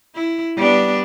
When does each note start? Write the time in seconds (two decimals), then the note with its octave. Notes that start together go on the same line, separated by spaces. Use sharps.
0.15 E4
0.56 G3 B3 D4